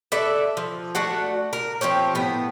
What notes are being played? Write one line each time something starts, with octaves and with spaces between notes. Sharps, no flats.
A4 B4 D5 E5
F3
A3 D4 F#4 F#5
A#4
F3 C4 G4 C#5
A2 B3